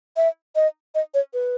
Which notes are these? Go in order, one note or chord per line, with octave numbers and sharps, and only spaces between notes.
E5
D#5
D#5
C#5
B4